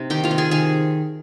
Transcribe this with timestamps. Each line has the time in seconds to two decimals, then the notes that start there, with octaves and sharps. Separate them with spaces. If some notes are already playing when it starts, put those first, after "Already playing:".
Already playing: C3 C4 D#4
0.10 D#3 G4 G5
0.24 F4 F5
0.31 C3
0.38 G#4 G#5
0.51 D#3 G#4 G#5